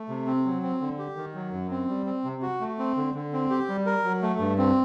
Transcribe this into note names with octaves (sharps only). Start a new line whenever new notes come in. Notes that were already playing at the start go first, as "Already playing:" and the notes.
Already playing: A3
C3
C4
F#3
C4
D3
G4
D#3
F#3
F#2
C4
G3
C4
C3
F#4
A3
C4
D3
D3
C4
G4
G3
A#4
F#3
A3
G2
C4